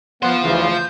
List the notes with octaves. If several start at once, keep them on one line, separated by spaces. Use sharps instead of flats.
B3 F4 C5 F#5
D2 C#3 E3
G6